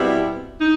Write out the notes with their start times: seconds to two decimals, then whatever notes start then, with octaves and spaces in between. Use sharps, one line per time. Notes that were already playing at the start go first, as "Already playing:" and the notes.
Already playing: B2 G3 C4 E4
0.61 D#4